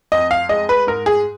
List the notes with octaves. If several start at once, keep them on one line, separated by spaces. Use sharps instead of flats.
F2 D#5
F5
G#3 D#5
B4
G#2 A#4
G#4